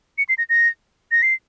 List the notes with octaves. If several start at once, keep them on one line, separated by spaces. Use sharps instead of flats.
C#7
C7
A#6
A#6
A#6
C7